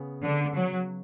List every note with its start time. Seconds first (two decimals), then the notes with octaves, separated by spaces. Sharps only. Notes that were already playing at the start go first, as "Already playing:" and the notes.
Already playing: C#3 B3
0.24 D3
0.55 F#3